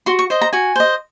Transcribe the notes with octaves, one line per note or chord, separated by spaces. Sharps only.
F#4 C6
C#6
C5 D#5
A#5
F#4 G#5
C5 D#5